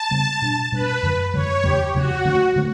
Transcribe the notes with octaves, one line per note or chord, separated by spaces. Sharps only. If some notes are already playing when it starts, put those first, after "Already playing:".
Already playing: A5
C#3 G3 B3
B2 G3 D4
B2 G3 D4 B4
F#2 D3 F#3
F#2 D3 F#3 C#5
E2 C#3 F#3 C#4 G4
E2 C#3 F#3 C#4 F#4
D3 F#3 A3 C#4 F#4
D3 F#3 A3 C#4